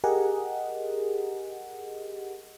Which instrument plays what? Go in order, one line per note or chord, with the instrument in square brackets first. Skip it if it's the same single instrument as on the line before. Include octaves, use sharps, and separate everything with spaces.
[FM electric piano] G4 G#4 A#4 D#5 F#5